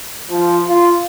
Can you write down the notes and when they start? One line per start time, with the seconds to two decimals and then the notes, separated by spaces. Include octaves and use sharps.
0.30 F3
0.66 F4